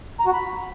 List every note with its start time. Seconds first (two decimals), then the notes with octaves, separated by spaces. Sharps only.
0.19 A#5
0.26 F#4
0.33 B5